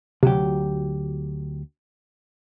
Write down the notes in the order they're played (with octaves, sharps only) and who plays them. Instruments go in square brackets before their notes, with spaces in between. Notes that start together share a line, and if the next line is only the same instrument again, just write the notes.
[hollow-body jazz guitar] D2 F#3 G4 [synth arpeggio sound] C3